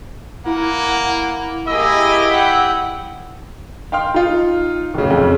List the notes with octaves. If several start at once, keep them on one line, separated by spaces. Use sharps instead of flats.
A#3 E4 F#5
A#3 E4 G4 G#4 D#5 E6
F#5 G5
F5 G5 C6 F6
D#4 F4
D1 C#3
F2 C#3